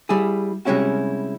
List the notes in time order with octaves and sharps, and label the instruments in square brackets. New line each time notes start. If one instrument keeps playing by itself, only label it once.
[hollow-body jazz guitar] G3 E4 G#4
C3 G3 G#3 C#4 E4 F#4